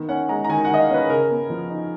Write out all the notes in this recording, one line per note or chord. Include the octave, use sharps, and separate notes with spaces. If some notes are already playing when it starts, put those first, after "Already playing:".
Already playing: D#3 B3
C#4 F#5
G#3 A#5
A#5
D#3 G#5
F#5
D#3 D#5
F5
C#4 B4
C#3 A#4
B3
F3
D#4